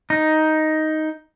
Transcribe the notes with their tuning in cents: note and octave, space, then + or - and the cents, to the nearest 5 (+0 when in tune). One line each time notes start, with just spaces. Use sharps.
D#4 +5